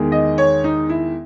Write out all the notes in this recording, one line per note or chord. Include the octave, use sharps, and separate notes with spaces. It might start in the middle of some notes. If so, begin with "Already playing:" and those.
Already playing: E2 D#3 G#3
D#5
C#5
D#4
E4